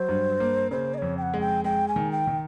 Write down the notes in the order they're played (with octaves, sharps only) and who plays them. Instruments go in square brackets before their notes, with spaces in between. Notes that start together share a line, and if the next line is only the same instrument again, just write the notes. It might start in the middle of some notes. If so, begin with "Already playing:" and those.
Already playing: [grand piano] F#3 [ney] C5
[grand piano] G2
A#3
[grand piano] C#3 [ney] C5
[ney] D#5
[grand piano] F2 [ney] C#5
[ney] G5
F#5
[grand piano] G#3
[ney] G5
[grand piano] G#3 [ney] G5
[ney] G#5
[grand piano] D#3
[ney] G5
[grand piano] D#3